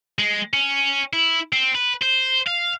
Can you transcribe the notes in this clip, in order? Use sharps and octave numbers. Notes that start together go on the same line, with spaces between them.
G#3
C#4
E4
C4
B4
C5
F5